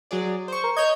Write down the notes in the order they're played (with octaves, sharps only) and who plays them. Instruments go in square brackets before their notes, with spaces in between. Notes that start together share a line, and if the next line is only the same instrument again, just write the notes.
[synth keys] F#3 G#4 D5
C5 C#6
[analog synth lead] A#4
[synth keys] C#5 G6 G#6 [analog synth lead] D#5